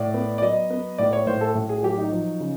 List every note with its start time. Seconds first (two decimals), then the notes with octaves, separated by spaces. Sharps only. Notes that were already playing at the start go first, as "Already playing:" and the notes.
Already playing: A2 D5
0.14 B3
0.38 D5
0.42 F#3 D#5
0.70 B3
0.98 A2 D5
1.13 C#5
1.27 A2 C5
1.41 A4
1.55 A2
1.69 G#4
1.83 F#3 G4
1.98 D#4
2.12 F3
2.40 C#3